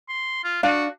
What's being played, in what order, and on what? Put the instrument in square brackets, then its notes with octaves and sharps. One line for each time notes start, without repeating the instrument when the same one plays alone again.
[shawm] C6
F4
[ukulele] D4 F5 [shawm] F#4